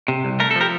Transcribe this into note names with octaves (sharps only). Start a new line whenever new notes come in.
C3
C2
A3 A#4
A4
F3
G4 A#4